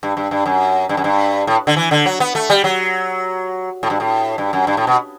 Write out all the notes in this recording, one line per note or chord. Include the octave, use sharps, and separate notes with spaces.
G2
G2
G2
F#2
G2
F#2
G2
A2
D3
E3
D3
F#3
B3
A3
G3
F#3
A2
G2
A2
G2
F#2
G2
A2
B2